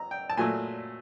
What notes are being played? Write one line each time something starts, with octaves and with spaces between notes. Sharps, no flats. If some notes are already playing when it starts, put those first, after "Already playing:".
Already playing: A#5
G5
A5
A#2 F#3 A3 G#5